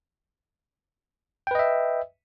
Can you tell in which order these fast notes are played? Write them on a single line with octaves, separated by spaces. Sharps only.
G5 B4 D#5 E5